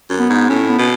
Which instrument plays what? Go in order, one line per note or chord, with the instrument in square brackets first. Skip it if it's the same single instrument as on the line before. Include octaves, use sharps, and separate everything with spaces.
[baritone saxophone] F#2
[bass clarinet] B3
[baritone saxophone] G#2
[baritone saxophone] A2 [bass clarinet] C#4
[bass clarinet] B3
[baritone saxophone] B2